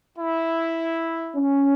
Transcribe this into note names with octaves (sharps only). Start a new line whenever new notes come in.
E4
C#4